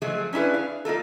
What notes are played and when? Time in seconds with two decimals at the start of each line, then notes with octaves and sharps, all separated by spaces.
0.02 F3 F#3 G#3 A3 G#4
0.33 C#4 D4 E4 G#4 B4
0.54 F5
0.85 A#3 D#4 F4 A4